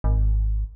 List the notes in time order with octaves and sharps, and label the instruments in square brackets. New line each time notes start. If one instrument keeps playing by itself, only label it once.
[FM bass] G#1